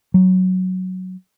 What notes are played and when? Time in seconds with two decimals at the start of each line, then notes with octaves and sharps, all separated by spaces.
0.14 F#3